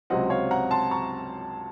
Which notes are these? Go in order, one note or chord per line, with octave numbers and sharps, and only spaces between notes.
C#2 C3 F#3 C4 D#5 F#5
C#5 F5
F#5 A#5
A5 C6
A#5 C#6